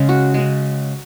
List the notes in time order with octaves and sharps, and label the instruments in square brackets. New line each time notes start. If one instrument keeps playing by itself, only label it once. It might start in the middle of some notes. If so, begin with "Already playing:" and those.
Already playing: [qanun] C#3 G#3 C#4
F#4
C#3 G#3